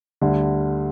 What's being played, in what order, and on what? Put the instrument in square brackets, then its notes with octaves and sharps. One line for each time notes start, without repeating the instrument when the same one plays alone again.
[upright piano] D2 D3 G3